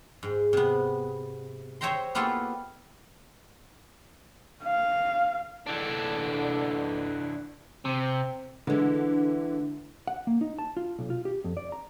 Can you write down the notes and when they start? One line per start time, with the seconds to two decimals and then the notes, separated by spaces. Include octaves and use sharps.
0.23 G#2
0.53 C3 B3
1.81 C5 C#5 E5 G5 A#5 C6
2.15 A#3 B3 E4 F4 G4 A4
4.64 F5
5.67 D3 E3 D4
7.85 C3 C4
8.67 D3 E3 G#3
10.07 F#5
10.27 A#3
10.41 D#4
10.59 A5
10.77 F4
10.99 B1
11.10 F4
11.25 G4
11.44 F2
11.57 D5
11.72 A#5